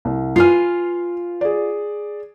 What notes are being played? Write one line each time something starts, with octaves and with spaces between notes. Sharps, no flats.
C2
F4 B4 G#5 F6 C7
G#4 D5